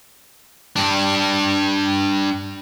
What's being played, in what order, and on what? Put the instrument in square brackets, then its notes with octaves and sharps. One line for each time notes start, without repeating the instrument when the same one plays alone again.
[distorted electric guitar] G2 D4